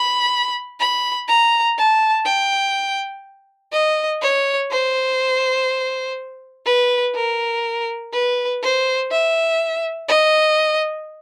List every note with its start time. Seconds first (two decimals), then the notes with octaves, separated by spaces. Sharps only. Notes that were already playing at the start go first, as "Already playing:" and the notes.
Already playing: B5
0.80 B5
1.28 A#5
1.78 A5
2.26 G5
3.73 D#5
4.22 C#5
4.71 C5
6.66 B4
7.16 A#4
8.13 B4
8.62 C5
9.11 E5
10.08 D#5